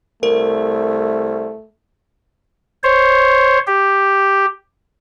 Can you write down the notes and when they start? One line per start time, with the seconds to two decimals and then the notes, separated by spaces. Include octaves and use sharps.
0.23 C2 A3 A#4
2.83 C5 C#5
3.67 G4